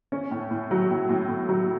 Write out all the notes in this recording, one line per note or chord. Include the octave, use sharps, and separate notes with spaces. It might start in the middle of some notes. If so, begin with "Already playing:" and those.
C#4
A2
A2
F#3
A2
A2
A2
F#3